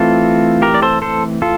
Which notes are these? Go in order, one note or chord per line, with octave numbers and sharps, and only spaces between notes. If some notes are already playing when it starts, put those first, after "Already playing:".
Already playing: E3 A3 C4 F4 A4
G4 A#4
D5
A4 C5
A4 C5
F4 A4